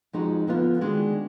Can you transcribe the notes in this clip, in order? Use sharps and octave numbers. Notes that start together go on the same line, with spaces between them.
F2 F3 G#3 D#4 F#4
D3 F3 B3 F4
D#3 G#3 D4 F#4